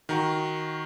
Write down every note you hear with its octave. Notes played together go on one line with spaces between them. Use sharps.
D#3 F#4 A#5